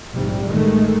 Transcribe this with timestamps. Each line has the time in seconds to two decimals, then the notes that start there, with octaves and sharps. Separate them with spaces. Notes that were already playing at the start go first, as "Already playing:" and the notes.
0.13 A#1 G#2 C3 G3
0.45 A1 D#3 G#3 A3